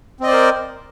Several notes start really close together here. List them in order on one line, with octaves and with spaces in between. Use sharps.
C4 D#5 D5 C5 A#4